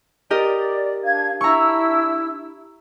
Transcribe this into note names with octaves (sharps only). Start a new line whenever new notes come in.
G4 A#4 D5 D#5
D4 F5 G#6
D4 E4 A#5 C#6 E6